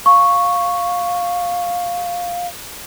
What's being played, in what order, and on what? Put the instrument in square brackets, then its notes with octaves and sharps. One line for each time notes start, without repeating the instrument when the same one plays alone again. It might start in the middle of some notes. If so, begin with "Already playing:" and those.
[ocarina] F5 [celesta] C#6